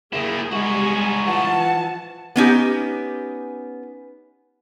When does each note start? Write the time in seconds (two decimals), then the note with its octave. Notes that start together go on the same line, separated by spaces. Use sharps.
0.13 A#3 E4 G#4
0.53 G3 G#3 D#4 F#4 G#5
1.26 E3 F3 F#5 A5
2.36 B3 C#4 D#4 G4